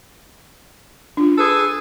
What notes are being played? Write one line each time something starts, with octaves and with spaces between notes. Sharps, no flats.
D4 F4
G#4 A4 B4